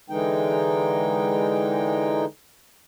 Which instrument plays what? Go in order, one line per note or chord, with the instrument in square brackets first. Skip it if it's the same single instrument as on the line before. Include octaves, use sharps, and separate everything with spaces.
[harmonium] D3 E3 G#3 D#4 G5